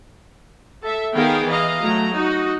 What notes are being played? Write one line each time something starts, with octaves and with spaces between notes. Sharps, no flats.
A4 E5
D#3 B3 G#4 A#4 F5 G5
E3 D#5 F5 A#5
F#3 A3 A#5
D#4 F#4